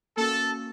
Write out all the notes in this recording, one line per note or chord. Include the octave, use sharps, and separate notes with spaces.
A#3 C#4 F#4 A4